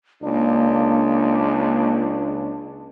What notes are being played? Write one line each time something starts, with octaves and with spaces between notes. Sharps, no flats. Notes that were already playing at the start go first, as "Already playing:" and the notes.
C#2 A#3 D4